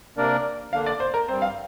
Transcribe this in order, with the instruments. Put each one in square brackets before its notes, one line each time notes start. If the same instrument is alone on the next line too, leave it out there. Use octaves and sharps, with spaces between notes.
[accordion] C3 A#3 D4 A#4 D5
[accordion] D3 A#3 D4 [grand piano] F5
[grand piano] D5
C5
A#4
[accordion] G2 G3 C4 [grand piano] C5
[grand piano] F5